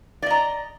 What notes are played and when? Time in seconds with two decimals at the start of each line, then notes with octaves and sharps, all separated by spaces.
0.22 D5
0.26 D#5
0.30 A#5